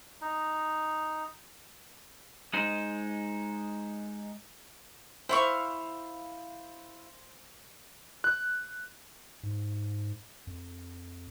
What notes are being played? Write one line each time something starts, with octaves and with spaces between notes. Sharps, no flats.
D#4
G#3 D#4 C5
E4 C5 F5 C#6
F#6
G#2
F2